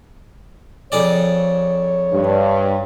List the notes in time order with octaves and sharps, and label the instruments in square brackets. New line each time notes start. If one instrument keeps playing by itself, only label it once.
[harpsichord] F2 G#4 D5 [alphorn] C#5
[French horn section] G2